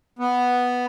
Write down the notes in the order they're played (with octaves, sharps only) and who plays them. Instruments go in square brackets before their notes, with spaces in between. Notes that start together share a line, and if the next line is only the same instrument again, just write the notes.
[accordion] B3